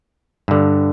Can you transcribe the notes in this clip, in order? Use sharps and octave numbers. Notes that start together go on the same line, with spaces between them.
G2 D3